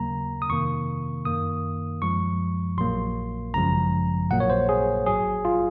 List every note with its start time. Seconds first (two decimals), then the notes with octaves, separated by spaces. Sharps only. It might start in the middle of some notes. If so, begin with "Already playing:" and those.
Already playing: D#2 C#3 F#3 A#3 A#5
0.42 D#6
0.49 F2 C3 D#3 A#3 C#6
1.25 F#2 D#3 A#3 D#6
2.02 F#2 F3 G#3 C#6
2.77 A#1 A#2 F#3 A#3 C6
3.54 G#1 F#2 C#3 F3 G#3 A#5
4.30 A#1 A#2 F#3 A#3 F#5
4.40 C#5
4.50 C5
4.69 G#4
5.07 G#1 G#2 F#3 G#4
5.45 F4